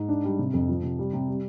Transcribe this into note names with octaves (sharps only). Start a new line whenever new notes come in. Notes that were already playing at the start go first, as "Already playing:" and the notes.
Already playing: G#2
D4
G3
C3
F2
F3
C3
G3
C3
G3